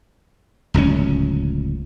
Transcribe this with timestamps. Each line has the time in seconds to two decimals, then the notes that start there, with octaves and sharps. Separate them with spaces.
0.74 D1 C#2 B2 C#4